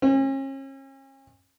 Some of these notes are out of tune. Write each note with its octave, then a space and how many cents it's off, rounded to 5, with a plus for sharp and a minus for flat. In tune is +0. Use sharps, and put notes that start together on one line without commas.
C#4 -40